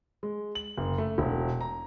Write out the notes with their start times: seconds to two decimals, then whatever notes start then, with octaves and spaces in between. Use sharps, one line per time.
0.23 G#3
0.55 F#7
0.78 F#1
0.98 A3
1.18 E1
1.61 A#5